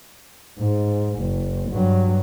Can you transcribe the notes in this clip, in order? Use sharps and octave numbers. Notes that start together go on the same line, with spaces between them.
G#2
F#1
G2 F#3